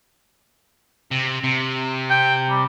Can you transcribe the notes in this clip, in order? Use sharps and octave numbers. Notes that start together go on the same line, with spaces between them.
C3
C3
G5
G3